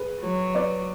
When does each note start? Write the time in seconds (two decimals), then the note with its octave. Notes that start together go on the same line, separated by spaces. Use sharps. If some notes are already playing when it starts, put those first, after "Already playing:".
Already playing: G#4 B4
0.22 F#3
0.55 B4 D5